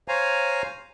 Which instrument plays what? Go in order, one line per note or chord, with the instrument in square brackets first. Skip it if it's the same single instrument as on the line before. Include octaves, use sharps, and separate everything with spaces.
[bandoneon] C5 C#5 F5 G#5 A#5